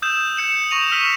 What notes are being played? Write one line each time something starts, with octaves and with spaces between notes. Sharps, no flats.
D#6 E6 G6 E7
G6 C#7 E7 F#7
C#6 A#6 D#7 F7
E6 F6 B6 D#7 E7